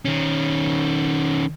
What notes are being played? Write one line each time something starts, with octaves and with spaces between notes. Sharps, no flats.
D#3 C#4